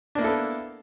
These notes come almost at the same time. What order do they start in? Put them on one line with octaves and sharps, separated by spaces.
D4 A#3 E4 A4 B3